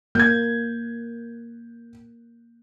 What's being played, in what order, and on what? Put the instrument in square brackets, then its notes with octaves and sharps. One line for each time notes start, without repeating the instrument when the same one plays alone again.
[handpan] A#3 [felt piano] G6 G#6